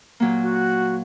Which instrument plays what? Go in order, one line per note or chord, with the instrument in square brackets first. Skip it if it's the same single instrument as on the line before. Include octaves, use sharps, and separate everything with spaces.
[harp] A#2 F#3 A#3
[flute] F#4